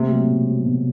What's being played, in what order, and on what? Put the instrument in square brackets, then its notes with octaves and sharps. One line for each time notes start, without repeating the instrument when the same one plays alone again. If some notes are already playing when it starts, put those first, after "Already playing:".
Already playing: [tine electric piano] C3 [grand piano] A3 A#3
[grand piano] F#3
B2
F#3
B2